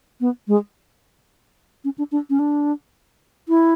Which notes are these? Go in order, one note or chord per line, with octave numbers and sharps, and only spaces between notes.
B3
G#3
C#4
D4
D4
C#4
D4
E4